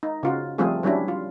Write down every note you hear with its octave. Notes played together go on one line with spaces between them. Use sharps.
D#4
C#3 F4 F#4
F3 G3 A3 C4 F4 G#4
F#3 G3 C#4 D4 E4
F4